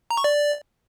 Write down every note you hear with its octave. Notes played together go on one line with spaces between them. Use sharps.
A#5
C#6
D5